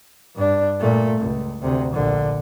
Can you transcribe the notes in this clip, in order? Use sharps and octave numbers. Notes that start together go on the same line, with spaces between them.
G2 D4
A#2 A3
C#2
D2 C3
A#1 D3